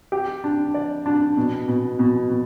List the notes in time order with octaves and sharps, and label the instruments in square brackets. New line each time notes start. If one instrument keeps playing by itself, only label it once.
[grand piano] G4
D4
D5
D4
B2
B2
B2
B2